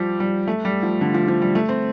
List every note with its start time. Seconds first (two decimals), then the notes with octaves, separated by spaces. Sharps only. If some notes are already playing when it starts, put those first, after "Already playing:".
Already playing: F3 G3
0.20 G3
0.48 A3
0.65 G3
0.83 F3
1.01 D3
1.14 F3
1.28 F3
1.42 G3
1.55 A3
1.69 C4